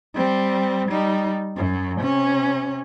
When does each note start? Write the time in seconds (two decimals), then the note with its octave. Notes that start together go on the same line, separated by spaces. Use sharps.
0.15 G3 C4
0.89 G3 D#4
1.57 F#2 F#3
2.00 C3 C#4